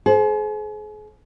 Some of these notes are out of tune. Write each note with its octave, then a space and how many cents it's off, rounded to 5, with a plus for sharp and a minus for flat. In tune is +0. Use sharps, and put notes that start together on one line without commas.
G#4 +40 C5 +0